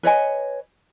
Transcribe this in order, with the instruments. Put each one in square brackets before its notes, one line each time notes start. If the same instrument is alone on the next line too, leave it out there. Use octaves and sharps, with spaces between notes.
[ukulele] B4 C#5 D#5 G#5